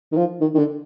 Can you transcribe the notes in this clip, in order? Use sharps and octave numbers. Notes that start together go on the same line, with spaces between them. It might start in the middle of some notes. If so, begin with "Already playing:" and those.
D#3
F3
D#3
D#3
D3